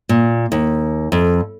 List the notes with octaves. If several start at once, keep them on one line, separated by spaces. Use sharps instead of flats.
A#2
D#2
F2